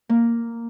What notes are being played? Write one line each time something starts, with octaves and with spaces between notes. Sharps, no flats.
A#3